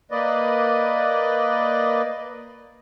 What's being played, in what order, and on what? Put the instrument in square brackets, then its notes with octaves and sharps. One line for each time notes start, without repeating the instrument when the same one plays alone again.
[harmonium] A#3 B4 D5 D#5